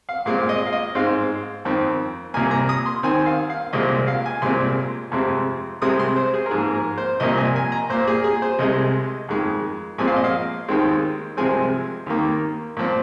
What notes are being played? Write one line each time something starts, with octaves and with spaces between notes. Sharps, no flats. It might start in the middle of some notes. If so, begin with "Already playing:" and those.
F5
A#2 G#3 C4 F5
D#5
F5
D#5
G#2 G#3 C4 F5
F2 D#3 C4
C2 A#2 A#3 G#5
A#5
D#6
C6
D#2 D#3 C4 G#5
F5
F5
C2 A#2 G#3 C4 D#5
F5
G#5
C2 A#2 G#3 C4 C6
F2 C3 G#3 C4
C2 C3 G#3 C4 D#6
C6
C5
G#4
A#4
G#2 F3 A#3 G#4
A#4
C5
C2 A#2 F3 A#3 D#5
G#5
G#5
A#5
A#2 A#3 C5
G#4
G#4
C5
C2 C3 G#3 D#5
F2 D#3 G#3
A#2 F3 G#3 C4 G#5
F5
D#5
F5
D#2 D#3 G#3 C4
C2 C3 F3 G#3 C4 G#5
D#2 D#3 A#3
A#2 F3 C4